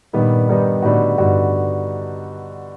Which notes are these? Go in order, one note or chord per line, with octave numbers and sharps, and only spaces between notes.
G2 A#2 D#3 G3 B3 D#4
G2 D#3 G3 B3 D#4
A2 D3 G3 B3 D#4 F#4
G2 D3 G3 B3 D#4 F#4